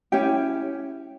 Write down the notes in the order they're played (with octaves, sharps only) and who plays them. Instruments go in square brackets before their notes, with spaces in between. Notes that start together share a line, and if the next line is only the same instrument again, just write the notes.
[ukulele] C#4 E4 G4 G5